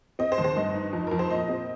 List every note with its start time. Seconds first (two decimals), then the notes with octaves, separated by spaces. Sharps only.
0.19 C4 D#5
0.32 C5
0.38 D#2
0.44 C5
0.57 G2 D#5
0.75 D#4
0.93 F2
1.07 F2 A#4
1.19 C5
1.30 A#2 D#5
1.49 C4